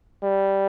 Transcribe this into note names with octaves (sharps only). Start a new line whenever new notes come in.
G3